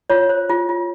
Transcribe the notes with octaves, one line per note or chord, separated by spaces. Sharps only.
F4 C#5
C5
F4
F4